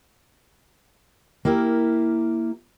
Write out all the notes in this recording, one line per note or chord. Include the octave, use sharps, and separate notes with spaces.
A#3 E4 G4 A#4